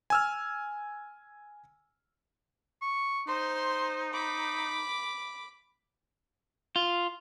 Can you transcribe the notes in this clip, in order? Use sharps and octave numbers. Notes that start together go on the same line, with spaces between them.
G#5 E6 F6
C#6
D#4 C5 C6
B5 D6
F4